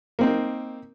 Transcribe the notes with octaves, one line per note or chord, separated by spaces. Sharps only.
A#3 C4 D#4